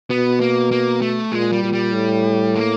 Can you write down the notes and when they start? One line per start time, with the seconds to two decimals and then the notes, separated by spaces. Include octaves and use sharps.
0.10 B2 B3
0.40 A#3
0.71 A#3
1.01 A3
1.32 A#2 G#3
1.52 G3
1.64 A#2
1.73 G3
1.93 A2
2.55 A#3